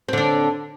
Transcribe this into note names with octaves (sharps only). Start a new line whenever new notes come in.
D3 C4 D4